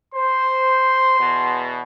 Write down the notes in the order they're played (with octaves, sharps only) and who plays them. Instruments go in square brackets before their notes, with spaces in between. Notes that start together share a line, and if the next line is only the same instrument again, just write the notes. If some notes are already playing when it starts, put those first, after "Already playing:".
[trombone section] C5 [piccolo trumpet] C6
[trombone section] E2 B2